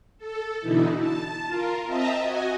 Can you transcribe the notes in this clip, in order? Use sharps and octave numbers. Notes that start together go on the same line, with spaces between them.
A4
B2 D3 E3 D#4 E4
A5
F4 A#4
C4 D#5 E5 A5 A#5
F#4 D#5 G#5